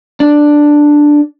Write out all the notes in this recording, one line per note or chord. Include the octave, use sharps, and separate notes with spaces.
D4